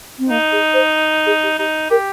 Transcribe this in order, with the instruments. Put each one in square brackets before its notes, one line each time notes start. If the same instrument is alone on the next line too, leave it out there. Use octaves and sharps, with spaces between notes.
[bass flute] C4
[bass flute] A#3 [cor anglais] D#4
[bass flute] G#4
C5
G#4
G4
[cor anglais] D#4 [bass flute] G4
[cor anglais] G4 [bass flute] A#4